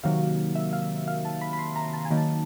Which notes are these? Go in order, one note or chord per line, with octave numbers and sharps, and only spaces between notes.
C3 D#3 F#3 A#3 F5
E5
F5
E5
F5
A5
B5
B5
C6
A#5
A5
G#5
D#3 F#3 A#3 D#4
A5